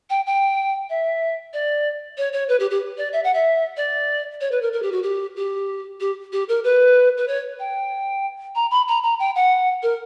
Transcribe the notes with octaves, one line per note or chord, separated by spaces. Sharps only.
G5
G5
E5
D5
C#5
C#5
B4
G4
G4
D5
E5
F#5
E5
D5
C#5
B4
A#4
A#4
G4
F#4
G4
G4
G4
G4
A#4
B4
B4
C#5
G5
A#5
B5
A#5
A#5
G5
F#5
A#4